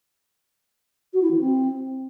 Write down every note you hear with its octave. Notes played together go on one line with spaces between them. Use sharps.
F#4
E4
E3
C4